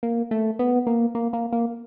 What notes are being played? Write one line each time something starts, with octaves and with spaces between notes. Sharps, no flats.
A#3
A3
B3
A#3
A#3
A#3
A#3